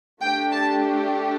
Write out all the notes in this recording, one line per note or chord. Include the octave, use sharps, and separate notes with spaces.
A3 D4 G4 G5
A5